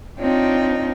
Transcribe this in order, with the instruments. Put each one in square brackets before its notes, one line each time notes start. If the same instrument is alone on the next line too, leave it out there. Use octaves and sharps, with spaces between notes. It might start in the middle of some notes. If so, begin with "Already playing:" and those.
[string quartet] C4 D4 D#4 F4 C#5 G5